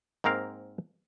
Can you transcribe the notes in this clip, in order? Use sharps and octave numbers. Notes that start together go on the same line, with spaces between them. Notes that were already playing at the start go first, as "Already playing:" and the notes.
G#2 A#3 C4 A#4 F5